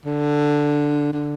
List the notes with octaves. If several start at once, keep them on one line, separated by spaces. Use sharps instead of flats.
D3
D3